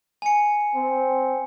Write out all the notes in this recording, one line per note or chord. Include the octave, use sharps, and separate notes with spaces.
G#5 C#7
C4